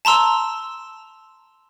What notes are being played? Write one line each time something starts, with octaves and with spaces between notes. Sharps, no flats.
A5 A#5 C6 E6